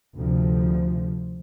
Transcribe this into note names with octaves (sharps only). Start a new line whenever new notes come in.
D2 C3 F3